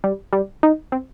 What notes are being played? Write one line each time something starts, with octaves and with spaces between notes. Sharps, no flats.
G3
G3
D#4
C4